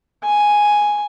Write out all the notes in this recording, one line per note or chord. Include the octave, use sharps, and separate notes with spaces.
G#5